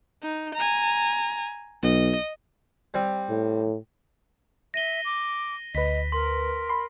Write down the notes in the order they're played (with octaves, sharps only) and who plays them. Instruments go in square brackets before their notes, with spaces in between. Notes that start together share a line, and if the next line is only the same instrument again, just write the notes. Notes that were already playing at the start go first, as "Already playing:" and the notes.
[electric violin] D#4
G#5 A#5
[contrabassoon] B1 [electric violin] D#5
[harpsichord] G3 C4
[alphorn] A2
[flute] E5 [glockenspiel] A#6 D#7 G7
[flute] D6
[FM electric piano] D2 B4 [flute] D#5 [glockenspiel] B6
[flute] A#4 [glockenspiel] C6
[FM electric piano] B5 C6